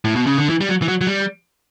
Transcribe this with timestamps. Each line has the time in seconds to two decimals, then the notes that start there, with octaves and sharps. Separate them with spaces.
0.05 A2
0.16 B2
0.26 C#3
0.38 D3
0.49 E3
0.61 G3
0.69 F#3
0.82 E3
0.88 F#3
1.01 F#3
1.07 G3